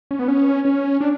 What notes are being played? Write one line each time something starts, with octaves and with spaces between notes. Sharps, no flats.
C#4
B3
C#4
C#4
D4